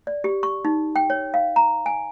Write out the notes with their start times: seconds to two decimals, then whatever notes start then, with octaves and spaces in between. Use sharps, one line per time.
0.07 D5
0.24 G4
0.43 C#6
0.65 D#4
0.96 G5
1.10 C#5
1.34 F5
1.56 A#5
1.86 G#5